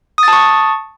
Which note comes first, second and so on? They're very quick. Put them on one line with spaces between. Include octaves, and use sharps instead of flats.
D#6 A6 A5 C#6